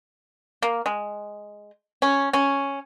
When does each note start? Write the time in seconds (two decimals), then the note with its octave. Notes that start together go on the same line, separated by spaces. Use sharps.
0.62 A#3
0.86 G#3
2.02 C#4
2.33 C#4